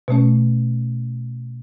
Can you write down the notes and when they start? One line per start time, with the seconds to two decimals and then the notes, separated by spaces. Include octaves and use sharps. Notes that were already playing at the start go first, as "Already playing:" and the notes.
0.08 B2 A3 C#4